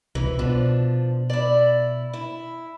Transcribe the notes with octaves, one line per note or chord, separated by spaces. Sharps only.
C2 E3
B2 F3 D4
E4 D5
E4